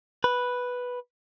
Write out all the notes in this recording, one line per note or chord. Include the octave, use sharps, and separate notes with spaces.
B4